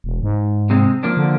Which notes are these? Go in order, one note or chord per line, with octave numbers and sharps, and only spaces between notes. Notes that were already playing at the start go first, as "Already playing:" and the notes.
E1
G#2
C3 G#3 C4
F3 A#3 D4
D3